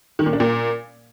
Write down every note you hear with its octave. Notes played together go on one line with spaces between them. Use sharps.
D#3
A#2
D4
A#2